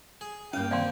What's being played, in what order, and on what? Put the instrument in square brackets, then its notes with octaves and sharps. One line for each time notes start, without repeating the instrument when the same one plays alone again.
[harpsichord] G#4
[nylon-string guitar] D2 G2 A#3 [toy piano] C#4 [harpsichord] F5 [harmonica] G5
[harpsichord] C3 D#3 [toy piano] D5 F5 C6